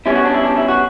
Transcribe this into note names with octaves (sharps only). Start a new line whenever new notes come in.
B2 G3 C#4 E4
F#4
D4
E4
D4
E4
F#4